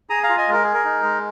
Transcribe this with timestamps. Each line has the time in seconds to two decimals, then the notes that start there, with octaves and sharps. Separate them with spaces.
0.10 G#4 A#5 D#6
0.23 F5 A#5
0.29 F4
0.37 D#5 G#5
0.48 G#3 A#4
0.63 G#4
0.74 A#4
0.84 D#4
1.03 G#3